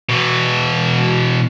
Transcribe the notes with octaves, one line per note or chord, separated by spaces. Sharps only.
B2 E3